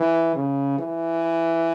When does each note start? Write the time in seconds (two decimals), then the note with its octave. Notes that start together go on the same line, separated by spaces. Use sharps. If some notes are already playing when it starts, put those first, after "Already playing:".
Already playing: E3
0.36 C#3
0.79 E3